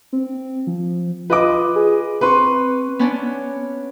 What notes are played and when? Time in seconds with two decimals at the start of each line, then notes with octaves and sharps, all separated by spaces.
0.13 C4
0.67 F3
1.30 F4 B4 D#5 D6
1.76 G#4
2.21 C4 B4 C6 C#6
2.99 B3 C#4 D4